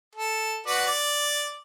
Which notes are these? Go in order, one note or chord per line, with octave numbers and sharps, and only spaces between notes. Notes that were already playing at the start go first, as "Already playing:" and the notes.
A4
F#4 B4 D5
D5